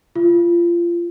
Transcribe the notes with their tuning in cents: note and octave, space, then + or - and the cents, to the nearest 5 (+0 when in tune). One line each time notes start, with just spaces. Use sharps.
F4 -25